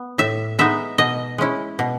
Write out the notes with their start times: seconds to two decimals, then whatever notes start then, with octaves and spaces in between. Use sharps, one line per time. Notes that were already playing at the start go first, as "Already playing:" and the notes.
Already playing: B3
0.18 A2 E5
0.59 G#3 B3 D#4 E5
0.98 B2 D#5
1.38 G#3 C#4 E4
1.79 B2